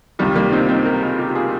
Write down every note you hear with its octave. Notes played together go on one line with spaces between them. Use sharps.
C#2 C3 D#3 G3
G3 A#3
C4 D#4
C4 D#4
G4 A#4
F4 G#4
G4 A#4
F4 G#4